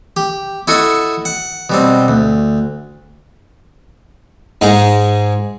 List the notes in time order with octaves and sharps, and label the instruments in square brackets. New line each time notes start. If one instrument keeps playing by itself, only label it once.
[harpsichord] G4
E4 F#4 A4 D#5 C#6 D#6
F#5
B2 G3 C4
D2
G#2 G#3 D#4